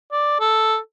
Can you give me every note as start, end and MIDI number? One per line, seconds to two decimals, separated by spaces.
0.12 0.36 74
0.40 0.77 69